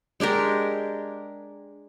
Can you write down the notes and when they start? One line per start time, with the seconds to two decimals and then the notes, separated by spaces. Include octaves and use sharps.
0.20 G#3 D4 G4 A#4